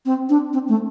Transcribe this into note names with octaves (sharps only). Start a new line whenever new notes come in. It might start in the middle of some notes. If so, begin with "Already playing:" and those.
C4
D4
C4
A3